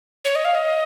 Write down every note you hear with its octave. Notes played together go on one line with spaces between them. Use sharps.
C#5
D#5
F5
D#5